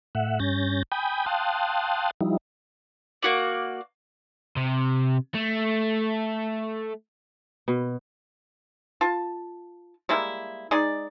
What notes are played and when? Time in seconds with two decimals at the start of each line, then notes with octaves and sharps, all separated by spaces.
0.15 A2 E5 F#5
0.40 G2 C#4 G6 A6 A#6
0.92 G5 G#5 B5 D#6 G6
1.26 F5 G5 A5 C6 D#6 F#6
2.21 F3 G3 D#4 E4
3.23 A#3 F#4 D5
4.57 C3
5.34 A3
7.68 B2
9.01 F4 A5
10.09 G3 G#3 A#3 E4
10.71 G#3 D#4 G#4 D5